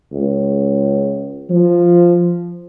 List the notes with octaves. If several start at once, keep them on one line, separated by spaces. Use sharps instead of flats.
C#2
F3